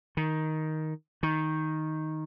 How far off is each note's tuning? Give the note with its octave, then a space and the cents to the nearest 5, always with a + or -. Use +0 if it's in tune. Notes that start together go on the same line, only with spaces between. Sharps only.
D#3 +5
D#3 +5